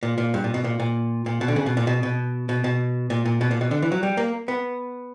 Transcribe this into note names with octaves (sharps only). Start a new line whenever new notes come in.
A#2
A#2
G2
A#2
B2
A#2
A#2
A#2
B2
D3
C#3
B2
A#2
B2
B2
B2
B2
A#2
A#2
B2
A#2
B2
D3
E3
F#3
G3
A#3
B3